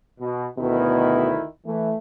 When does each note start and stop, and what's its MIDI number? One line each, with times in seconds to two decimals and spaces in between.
0.20 0.46 47
0.58 1.44 38
0.58 1.33 47
0.58 1.44 51
0.58 1.44 64
1.66 1.91 52
1.66 1.97 57